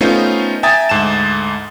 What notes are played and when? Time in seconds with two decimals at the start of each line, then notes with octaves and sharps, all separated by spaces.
0.01 A3 B3 C#4 D#4 F4 C5
0.63 E5 G5 G#5 A#5 D#6 A6
0.89 D2 G#2 A5 E7